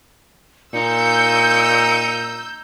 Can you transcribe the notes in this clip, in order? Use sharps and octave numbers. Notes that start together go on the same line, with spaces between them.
A#2 D#4 E6 G6 C#7